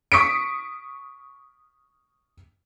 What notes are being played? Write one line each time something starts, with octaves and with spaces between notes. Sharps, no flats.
C#6 D#6 B6 C#7 D7